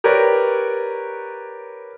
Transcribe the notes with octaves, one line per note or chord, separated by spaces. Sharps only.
G4 A#4 B4 C#5 D5